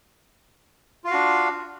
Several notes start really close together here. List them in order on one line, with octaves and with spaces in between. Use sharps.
F4 F5 F#4 D4